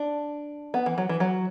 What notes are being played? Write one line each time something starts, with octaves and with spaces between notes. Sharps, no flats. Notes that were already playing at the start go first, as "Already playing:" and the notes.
Already playing: D4
B3
E3
F#3
E3
F#3